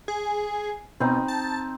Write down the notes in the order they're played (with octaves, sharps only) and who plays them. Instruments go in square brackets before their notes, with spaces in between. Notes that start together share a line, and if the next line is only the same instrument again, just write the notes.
[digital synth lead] G#4
[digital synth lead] B2 [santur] C4 D#4
[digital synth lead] A5